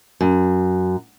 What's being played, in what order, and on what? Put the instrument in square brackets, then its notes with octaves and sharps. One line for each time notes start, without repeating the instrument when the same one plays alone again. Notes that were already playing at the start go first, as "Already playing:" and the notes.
[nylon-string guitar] F#2